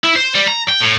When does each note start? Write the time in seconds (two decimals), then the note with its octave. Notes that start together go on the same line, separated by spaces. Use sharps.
0.04 E4
0.16 C5
0.34 G3
0.48 A#5
0.69 G5
0.81 A2